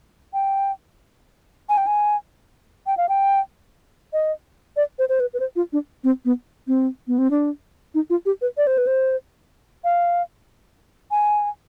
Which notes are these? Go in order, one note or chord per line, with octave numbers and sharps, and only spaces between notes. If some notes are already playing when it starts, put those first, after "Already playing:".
G5
G#5
G5
G#5
G5
F5
G5
D#5
D5
C5
C5
B4
B4
C5
F4
D4
C4
B3
C4
B3
C4
D4
D#4
F4
G4
B4
D5
C5
B4
C5
F5
G#5